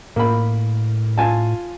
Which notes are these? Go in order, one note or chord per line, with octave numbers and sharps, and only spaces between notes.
A2 A#3 B5
F4 G#5 A5